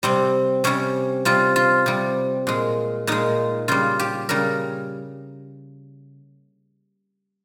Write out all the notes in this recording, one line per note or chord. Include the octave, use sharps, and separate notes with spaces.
C3 G3 C4
C3 G3 C#4
C3 G3 F4
F4
C3 G3
A#2 G#3
A#2 G#3 D#4
C#3 G3 F4
G4
C#3 G3 A#4